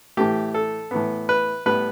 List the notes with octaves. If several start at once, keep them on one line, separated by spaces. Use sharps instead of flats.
A2 E3 A3 G4
A4
A2 E3 B3
B4
A2 G3 B3 B4